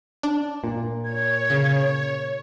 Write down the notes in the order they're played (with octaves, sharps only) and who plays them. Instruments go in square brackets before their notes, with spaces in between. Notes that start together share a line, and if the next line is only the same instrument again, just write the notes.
[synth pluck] D4
[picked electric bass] A#2
[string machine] C#5 [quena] G#6
[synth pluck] C#3